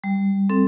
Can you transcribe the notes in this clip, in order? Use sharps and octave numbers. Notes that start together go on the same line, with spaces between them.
G3
C4 A4